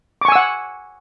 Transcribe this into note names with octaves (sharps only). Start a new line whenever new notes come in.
F#5 G#5 C#6 D6 E6